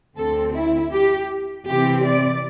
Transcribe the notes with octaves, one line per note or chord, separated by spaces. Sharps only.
D2 D3 C4 A4
E4
G4
C3 E3 C4 G4
D5